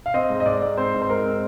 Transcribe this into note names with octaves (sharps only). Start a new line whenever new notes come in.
F5
C4 D#5
G#2
D#5
G#2 D5
G#2
C4 C5
G#2
C5
G#2 A#4
C4